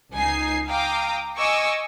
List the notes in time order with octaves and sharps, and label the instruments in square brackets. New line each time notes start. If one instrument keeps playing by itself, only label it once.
[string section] C#2 D#4 G#5 C7
F5 G5 A#5 D6 D#6
D#5 G#5 C#6 D6 E6